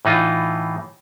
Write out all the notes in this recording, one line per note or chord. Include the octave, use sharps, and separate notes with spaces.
A2 E3 D#4 F4